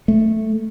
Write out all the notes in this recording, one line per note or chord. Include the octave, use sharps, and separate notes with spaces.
A3